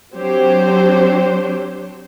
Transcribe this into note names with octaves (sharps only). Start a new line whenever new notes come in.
F#3 C4 D4 G4 C5 C#5